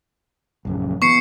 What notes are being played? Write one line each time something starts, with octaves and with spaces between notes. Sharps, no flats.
A#1 F#2 C#3
E3 B3 C#6 C7 C#7